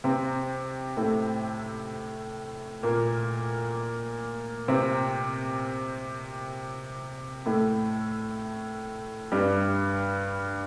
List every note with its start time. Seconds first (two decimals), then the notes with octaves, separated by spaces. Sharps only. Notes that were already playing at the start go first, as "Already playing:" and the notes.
0.04 C3 C4
0.97 A2 A3
2.83 A#2 A#3
4.68 C3 C4
7.46 A2 A3
9.32 G2 G3